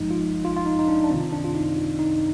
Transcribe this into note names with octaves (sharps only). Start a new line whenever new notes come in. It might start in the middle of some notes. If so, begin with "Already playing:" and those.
Already playing: G1 G2 F3 G#3 D#4
F4
F4
F4
D#4
D#4
D4
D4
C2 C3 D#3 C4
D4
F4
D#4
F4
D#4